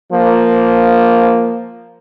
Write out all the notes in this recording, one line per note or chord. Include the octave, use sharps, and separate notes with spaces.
F3 A#3